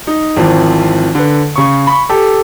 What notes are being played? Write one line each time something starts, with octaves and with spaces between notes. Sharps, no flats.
D#4
G#1 E3 F3 C4
D3 B4
C#3 C#6
B5 C#6
G4 A4